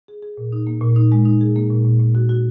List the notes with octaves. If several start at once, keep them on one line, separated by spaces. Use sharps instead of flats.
G#4
G#4
A#2
D#4
A#3
A#2
D#4
G#3
D#4
G#4
A#3
A#2
A#2
A#2
F#4
F#4